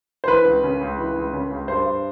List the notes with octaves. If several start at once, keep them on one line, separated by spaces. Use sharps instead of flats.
C5
E3 B4
C#2
C#3
C#2
E3
C#2
C#3
C#2
G2 C5
G2